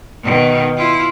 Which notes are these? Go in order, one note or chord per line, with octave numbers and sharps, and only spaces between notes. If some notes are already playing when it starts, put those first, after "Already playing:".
B2 D#3
E4 F4